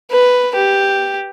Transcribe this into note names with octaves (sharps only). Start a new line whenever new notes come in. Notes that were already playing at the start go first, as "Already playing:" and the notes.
B4
G4